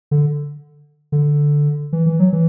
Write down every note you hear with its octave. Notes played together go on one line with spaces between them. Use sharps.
D3
D3
E3
E3
F#3
E3